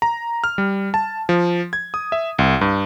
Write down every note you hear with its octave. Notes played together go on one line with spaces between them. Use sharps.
A#5
F6
G3
A5
F3
G#6
D#6
E5
C2
G2